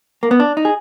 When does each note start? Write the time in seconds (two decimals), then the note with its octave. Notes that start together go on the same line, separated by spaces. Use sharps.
0.23 A#3
0.31 B3
0.40 D4
0.57 D#4
0.65 G#4